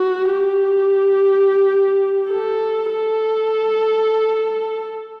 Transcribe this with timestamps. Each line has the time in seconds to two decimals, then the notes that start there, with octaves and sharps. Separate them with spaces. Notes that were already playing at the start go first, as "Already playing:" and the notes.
Already playing: F#4
0.32 G4
2.29 A4
2.95 A4